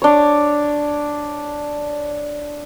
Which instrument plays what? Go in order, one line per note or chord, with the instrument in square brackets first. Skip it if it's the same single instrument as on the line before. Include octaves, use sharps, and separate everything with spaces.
[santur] D4 C#5